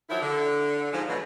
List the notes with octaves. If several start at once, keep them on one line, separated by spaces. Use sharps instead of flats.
D#3 F3 F#3 E4
D3
G#2 F3 G#3
G#2 B2 D3 E3 F#3 G#3